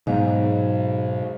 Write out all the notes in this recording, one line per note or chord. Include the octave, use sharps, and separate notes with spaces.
G#2 B2 F#3 B3 C5 D#5 F5